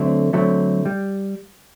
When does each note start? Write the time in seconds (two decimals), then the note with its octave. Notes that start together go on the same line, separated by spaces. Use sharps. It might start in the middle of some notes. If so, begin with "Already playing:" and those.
Already playing: D3 F#3 A3 C4
0.33 D3 F#3 A3 C4
0.86 G3